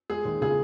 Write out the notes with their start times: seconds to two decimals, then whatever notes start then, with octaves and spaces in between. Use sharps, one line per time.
0.10 G#3 G#4
0.25 D#2
0.41 C#3 G#4